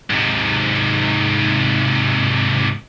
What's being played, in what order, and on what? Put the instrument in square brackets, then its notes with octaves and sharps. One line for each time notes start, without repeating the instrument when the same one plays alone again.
[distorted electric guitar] G#2 C3